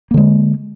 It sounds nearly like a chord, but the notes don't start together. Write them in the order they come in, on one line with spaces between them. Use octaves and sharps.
A#3 D3 G#3